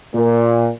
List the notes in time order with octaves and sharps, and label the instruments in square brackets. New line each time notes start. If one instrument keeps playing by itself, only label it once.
[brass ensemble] A#2